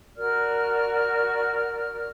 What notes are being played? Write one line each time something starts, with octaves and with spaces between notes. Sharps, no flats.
F#4 A#4 D5 F6